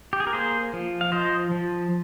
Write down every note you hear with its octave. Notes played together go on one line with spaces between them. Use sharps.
G4
G#4
A#4
A#3 G#4 C5
F3
F5
F3 C5 D#5
F3